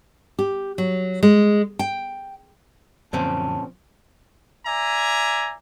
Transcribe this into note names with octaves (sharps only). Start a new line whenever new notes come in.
G4
F#3
G#3
G5
F#2 A#2 D3 F3 C4 C#4 A5
D5 E5 G#5 A#5